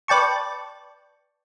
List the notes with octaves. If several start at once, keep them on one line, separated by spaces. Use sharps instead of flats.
B4 D5 G5 A5 C#6